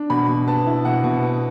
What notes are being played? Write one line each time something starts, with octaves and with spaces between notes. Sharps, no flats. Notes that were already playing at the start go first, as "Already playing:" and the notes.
Already playing: D4
B2 B5
B2
B3 A5
E4
B2 F#5
B2
B3